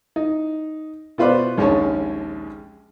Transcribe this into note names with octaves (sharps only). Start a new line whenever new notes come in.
D#4
B2 F4 B4 C5 D5
A#1 D#2 G#3 C#4 C#5 A5